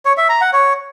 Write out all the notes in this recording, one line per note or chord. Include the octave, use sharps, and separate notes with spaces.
C#5
E5
A#5
F#5
C#5